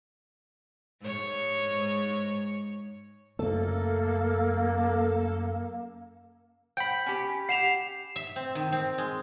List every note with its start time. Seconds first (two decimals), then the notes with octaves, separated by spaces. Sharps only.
1.01 G#2 C#5
3.39 F#2 C#3 A3 A#3 A4
6.77 C5 F#5 G5 B5
7.06 C#4 G4
7.49 G4 F#5 C7 E7 F7
8.16 E5
8.36 C4
8.55 D#3
8.72 C4
8.98 G#3